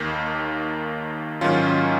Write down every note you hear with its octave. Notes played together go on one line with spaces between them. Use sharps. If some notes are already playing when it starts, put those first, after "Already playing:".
Already playing: D#2 D#3 A#3
G#2 D#3 F#3 C#4 F4